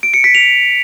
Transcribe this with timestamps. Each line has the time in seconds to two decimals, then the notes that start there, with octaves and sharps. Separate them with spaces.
0.03 D7
0.14 C#7
0.24 B6
0.35 F7